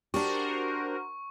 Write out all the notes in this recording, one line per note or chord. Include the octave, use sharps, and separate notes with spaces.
D4 F#4 G4 A#4 C5 C#6